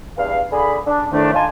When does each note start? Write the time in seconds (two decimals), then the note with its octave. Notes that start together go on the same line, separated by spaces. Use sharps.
0.17 E2 G2 F5
0.52 D3 G#4 B5
0.87 D4
1.12 F2 A2 D#3 A3 D4
1.34 D#4 F4 G#5 A5 C6